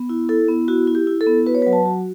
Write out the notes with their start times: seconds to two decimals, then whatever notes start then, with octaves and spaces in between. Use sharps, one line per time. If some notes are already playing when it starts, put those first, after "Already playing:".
Already playing: B3
0.09 E4
0.29 E4 A4
0.48 B3
0.68 E4 F#4
0.88 E4
0.95 G4
1.07 E4
1.21 A4
1.26 B3
1.46 F#4 B4
1.55 C#5
1.62 B4
1.66 F#3
1.73 A5
1.86 F#4